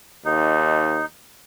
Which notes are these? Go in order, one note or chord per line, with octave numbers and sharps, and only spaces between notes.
D#2 D#4